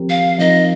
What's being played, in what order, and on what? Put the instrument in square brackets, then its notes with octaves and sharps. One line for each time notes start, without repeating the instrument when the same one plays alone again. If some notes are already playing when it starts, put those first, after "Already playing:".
Already playing: [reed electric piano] F3 C4 G4 A#4
[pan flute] F5
[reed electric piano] F3 C4 D#4 A#4 [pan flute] D#5